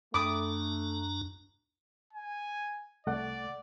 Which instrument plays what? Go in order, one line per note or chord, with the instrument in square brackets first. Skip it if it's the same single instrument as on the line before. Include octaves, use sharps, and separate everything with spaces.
[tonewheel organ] F#2 D4 A#5 [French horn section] A3 [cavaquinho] B5 D#6 [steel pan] D6
[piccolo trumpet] G#5
[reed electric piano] C2 A3 F#5 [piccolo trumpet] D5